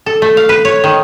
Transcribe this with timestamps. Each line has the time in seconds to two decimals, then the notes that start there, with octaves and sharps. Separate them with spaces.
0.06 A4
0.22 A3
0.37 F5
0.49 B4
0.65 C#5
0.84 D#3